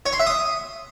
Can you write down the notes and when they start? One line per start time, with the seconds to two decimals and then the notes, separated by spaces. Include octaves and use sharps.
0.06 C#5
0.13 C6
0.20 E5
0.27 D#6